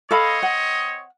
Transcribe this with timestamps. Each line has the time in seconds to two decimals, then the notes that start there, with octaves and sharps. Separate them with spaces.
0.11 C4 A4 C#5 D#5 F5 B5
0.42 F#5